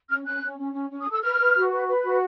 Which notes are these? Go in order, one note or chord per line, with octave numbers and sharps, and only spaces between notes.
C#4 F6
C#4 F#6
C#4
C#4
C#4
C#4
D#6
A4
E6
B4 F6
B4
F#4
B4
B4
F#4